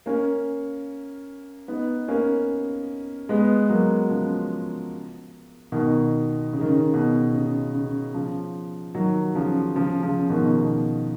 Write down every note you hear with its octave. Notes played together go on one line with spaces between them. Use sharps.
A#3 C#4
B3 D#4
A#3 C#4
G#3 B3
F#3 A#3
C#3 F3
B2 D#3
C#3
D#3
C#3
B2
C#3
C#3
C#3 F3
D#3 F#3
C#3 F3
C#3 F3
C#3 F3
B2 D#3
B2